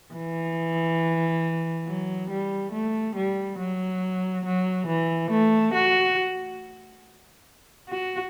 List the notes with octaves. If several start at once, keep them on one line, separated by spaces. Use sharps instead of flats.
E3
F#3
G3
A3
G3
F#3
F#3
E3
A3
F#4
F#4